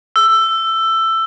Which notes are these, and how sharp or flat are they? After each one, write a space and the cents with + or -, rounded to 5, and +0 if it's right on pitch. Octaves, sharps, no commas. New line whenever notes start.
E6 +15